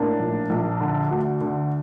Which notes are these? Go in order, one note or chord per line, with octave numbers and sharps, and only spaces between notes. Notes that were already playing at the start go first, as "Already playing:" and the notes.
Already playing: A2 A#3 D4
A#1
A#1
D3
D2
D3